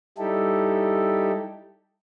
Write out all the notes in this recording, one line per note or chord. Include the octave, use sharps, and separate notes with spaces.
G3 D#4 E4 G4 A4